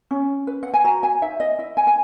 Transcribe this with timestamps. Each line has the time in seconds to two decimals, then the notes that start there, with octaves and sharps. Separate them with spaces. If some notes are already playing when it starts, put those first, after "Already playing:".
0.11 C#4
0.47 B4
0.63 F#5
0.74 G#5
0.84 F#4 A#5
1.03 G#5
1.22 D#4 E5
1.40 D#5
1.59 E4 E5
1.77 G#5
1.87 G#5